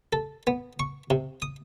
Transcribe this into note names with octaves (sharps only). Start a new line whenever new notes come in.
A4
B3
C#6
C3
D#6